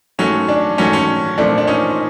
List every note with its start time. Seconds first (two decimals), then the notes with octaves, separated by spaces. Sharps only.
0.19 G#2 D#3 F#3 A3 C#4
0.48 D4
0.78 G#2 D#3 F#3 A3 C#4
0.93 C#4
1.38 A#2 F3 A3 C4 D4
1.58 D4
1.67 C#4 D#4